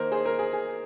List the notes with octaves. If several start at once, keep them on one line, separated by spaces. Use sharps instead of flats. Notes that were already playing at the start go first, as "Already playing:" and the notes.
Already playing: D#3 A#3 A#4 C5
G#4 C5
A#4
G#4
G#4